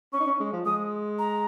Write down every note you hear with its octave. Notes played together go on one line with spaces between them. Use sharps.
C#4 C#6
D#4
C#4
G#3
F3
G#3 D#6
A#5